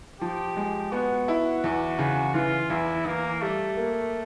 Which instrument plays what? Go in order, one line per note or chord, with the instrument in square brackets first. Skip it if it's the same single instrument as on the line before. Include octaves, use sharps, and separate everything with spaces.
[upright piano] F3 [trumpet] G4
[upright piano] G#3
[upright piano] B3 [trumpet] F#4
[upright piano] E4
E2
C#3
[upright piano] E3 [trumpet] F4
[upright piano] E2 [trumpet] E4
[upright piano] E3 [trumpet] A#3
[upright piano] G3 [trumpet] A3
[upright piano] A#3